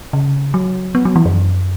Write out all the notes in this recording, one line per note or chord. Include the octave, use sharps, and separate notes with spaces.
C#3
F#3
B3
F#3
E3
F#2